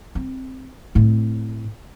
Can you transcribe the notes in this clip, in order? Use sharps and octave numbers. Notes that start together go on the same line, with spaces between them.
C4
A2 C4